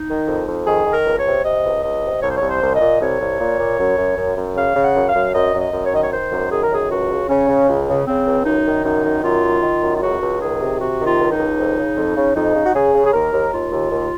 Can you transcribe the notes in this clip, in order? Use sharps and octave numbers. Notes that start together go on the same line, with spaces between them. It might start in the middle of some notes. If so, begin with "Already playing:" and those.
Already playing: D#4
D#3
F2
F2
D#3 G#4
D#3
A#4
C#2
C#5
C3
C3 D#5
C#2
C#2 D#5
C3
C2 C#5
C5
C2 C#5
C5
C2
D#5
A#2
C2 C#5
C2
A#2
A#2
F#2
F#2
F#2
F#2
C#3 F5
C#3
F#5
F#2
F5
F#2
F#2 D#5
F#2
D#5
F#2
C#5
D#3 D#5
C#5
D#3 C5
F#2
D#3 G#4
A#4
F#2 G#4
C#2 F#4
C#3
C#3 C#4
C#3
C#2
C#3
C#3 C4
C#2
F#2 D#4
D#3
F#2 D#4
D#3
F#2 F4
D#3
D#3
F#2
F4
C#2 F#4
C#2
D#3 G#4
C3
C3 F#4
D#3
F4
C#2
D#4
C#2
F2
C#3
F2
C#3
F2 D#4
C#3
F#4
C#3 G#4
C#3
G#4
D#2 A#4
D#2
D#2 F4
D#2
D#2